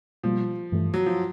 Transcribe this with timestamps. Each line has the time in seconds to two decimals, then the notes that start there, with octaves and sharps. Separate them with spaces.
0.23 B2 F3 G3 A#3
0.72 G2 E3 A3
0.94 F#3
1.06 F3